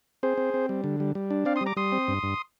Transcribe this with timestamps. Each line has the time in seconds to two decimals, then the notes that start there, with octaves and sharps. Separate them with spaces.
0.23 C4 G#4 C5
0.38 C4
0.54 C4
0.69 G3
0.84 D3
1.00 G3
1.15 G3
1.31 D4
1.45 C4 D5 F5
1.56 C6 D#6
1.61 G3
1.66 A#5 D6
1.76 G3 C6 D#6
1.92 C4
2.08 G2
2.23 G2